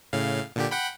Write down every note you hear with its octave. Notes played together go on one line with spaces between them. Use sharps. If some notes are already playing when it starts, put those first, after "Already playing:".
A2 C#3 F5
A#2 D3 G4
F#5 G5 B5